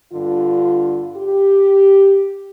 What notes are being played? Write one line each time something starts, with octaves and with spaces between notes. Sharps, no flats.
G2 D3 F4
G4